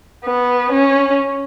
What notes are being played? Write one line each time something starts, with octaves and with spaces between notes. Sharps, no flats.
B3
C#4